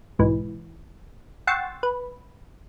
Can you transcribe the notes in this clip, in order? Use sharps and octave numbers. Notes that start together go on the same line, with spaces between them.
B1 G#2 E3
F#5 G5 C6 C#6 E6 A6
B4